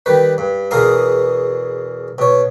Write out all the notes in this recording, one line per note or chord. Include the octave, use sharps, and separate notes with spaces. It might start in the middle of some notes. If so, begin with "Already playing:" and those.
D#3 G3 B4
G2
E2 B2 G#4 A#4 F5 D#6
B2 C#5